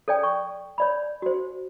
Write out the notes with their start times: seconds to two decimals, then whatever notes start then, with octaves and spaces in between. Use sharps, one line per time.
0.08 A4 C#5 D5 G5
0.23 C#6
0.78 C#5 D5 B5
1.22 F#4 C5